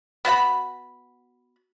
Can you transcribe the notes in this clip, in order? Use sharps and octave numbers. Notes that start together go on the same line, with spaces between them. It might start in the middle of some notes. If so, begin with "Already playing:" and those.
B3 F#4 F#5 B5